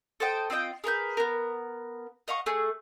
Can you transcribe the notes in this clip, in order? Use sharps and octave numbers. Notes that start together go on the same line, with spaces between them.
A4 C5 D#5 G5
C4 F4 D#5 G5
G#4 A#4 B4 G6
B3 A#4
D#5 F5 F#5 C#6
A3 G#4